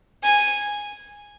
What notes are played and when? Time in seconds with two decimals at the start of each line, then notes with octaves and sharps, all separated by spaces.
0.23 G#5